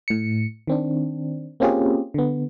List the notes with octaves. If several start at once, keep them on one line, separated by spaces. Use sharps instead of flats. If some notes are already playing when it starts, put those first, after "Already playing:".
A2 C#7
D#3 C4 D4
A#3 C4 C#4 F4 G4 G#4
D3 B3